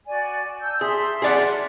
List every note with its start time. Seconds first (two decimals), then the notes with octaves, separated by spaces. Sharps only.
0.07 F#4 D5 G#5
0.62 A5 E6 G6
0.81 G#4 E5 A5 C6
1.22 G#4 D5 F#5